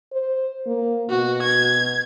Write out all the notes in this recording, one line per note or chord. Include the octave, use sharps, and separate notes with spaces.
C5
A#3
B2 F#4
G#6